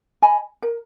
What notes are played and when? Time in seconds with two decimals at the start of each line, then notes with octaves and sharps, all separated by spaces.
0.22 D#5 G#5 B5
0.62 A#4